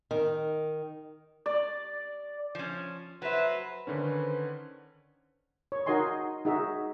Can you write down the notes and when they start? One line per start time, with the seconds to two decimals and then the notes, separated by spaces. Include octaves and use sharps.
0.11 D#3
1.46 D5
2.55 F3 C#4
3.22 F#3 B4 C5 E5
3.87 D3 D#3 C#4 B4 C5
5.72 C#5
5.86 D#4 F#4 A#4 D#5 G#5 C6
6.45 D#4 F#4 G#4 E5